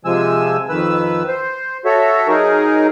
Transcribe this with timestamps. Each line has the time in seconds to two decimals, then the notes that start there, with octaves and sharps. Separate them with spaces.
0.05 C3 F3 G#3 G#5 E6
0.69 F2 D#3 B4 E6
1.28 C5
1.85 F#4 A4 C#5 E5
2.28 F#3 D#4 G#4 A#4